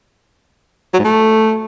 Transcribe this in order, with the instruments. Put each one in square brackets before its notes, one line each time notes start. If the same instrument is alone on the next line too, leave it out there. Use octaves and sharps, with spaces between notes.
[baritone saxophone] F#3
G#2
A3